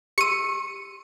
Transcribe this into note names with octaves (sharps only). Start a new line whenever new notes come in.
G4 C6 E6 C#7 D#7